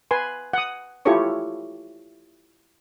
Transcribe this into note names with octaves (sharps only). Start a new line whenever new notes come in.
B4 G#5 C6
F#5 D#6
E4 F4 G4 A4 C#5 C#6